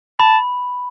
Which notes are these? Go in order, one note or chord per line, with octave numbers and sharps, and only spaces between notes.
A5 B5